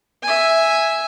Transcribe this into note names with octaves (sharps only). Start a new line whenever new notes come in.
E5 G#5